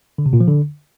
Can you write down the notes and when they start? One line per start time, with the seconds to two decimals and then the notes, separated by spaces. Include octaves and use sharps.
0.18 D3
0.26 C3
0.33 A#2
0.40 F3
0.48 D3